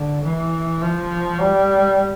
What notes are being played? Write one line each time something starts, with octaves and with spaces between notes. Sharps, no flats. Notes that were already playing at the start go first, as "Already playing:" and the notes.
Already playing: D3
E3
F3
G3